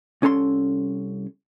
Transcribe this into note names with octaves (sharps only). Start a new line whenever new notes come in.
C2 C#4 A4 A#5 C6